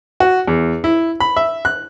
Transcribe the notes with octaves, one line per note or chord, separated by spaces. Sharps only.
F#4
E2
E4
B5
E5
F#6